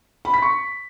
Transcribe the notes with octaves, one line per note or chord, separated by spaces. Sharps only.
B5
B6
C#6